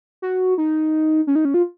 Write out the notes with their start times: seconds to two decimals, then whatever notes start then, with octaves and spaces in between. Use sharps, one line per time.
0.22 F#4
0.58 D#4
1.27 C#4
1.35 D#4
1.45 C#4
1.54 F4